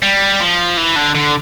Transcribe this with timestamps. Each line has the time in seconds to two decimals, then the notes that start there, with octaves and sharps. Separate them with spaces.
0.02 G3
0.40 F3
0.77 E3
0.96 D3
1.15 D3